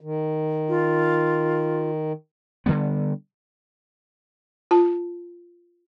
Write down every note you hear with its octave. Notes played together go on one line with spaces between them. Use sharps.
D#3
F4
D3 F#3 G3 B3
F4 A5